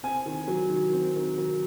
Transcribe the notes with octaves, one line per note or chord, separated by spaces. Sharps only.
C4 G#5
D#3
F#3
D#3
C4
D#3
F#3